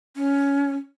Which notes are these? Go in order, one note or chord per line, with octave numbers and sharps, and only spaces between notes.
C#4